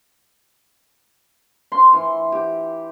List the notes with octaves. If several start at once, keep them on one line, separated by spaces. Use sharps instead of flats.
C6
E3
G4